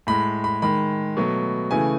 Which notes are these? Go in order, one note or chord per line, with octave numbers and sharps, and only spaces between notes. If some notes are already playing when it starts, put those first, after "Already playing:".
A2 G#3 B5
B5
D#3 G#3 B5
B2 F#3 A3
C#3 E3 A3 G#5